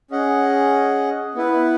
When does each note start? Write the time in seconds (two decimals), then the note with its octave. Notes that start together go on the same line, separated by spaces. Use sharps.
0.11 C#4 G#4 D#5 F#5
1.35 B3 E4 B4